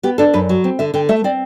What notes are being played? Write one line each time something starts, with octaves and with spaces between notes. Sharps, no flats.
B3 G4
D4 A4
F#2 B4
F#3
C4
D3 E5
D3 G5
A3 E5
C4 D5